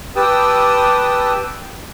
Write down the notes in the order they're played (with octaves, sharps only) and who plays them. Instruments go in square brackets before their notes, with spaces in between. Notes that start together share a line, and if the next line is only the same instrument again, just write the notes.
[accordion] G4 B4 G5 A5 D#6 E6